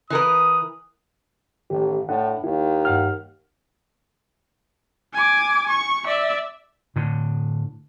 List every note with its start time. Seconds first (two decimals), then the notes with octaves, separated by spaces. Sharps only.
0.10 E3 A#4 B4 D#6
1.70 A1 D#3 G4
2.09 A2 D4 F#5
2.44 D#2 E4
2.85 G2 F#5 F6
5.14 G#5 D6
5.69 C#6
6.06 D5 E5
6.96 A2 D3